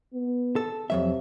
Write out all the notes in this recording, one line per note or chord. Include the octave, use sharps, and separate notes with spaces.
B3
A4
F2 C3 F#3 E5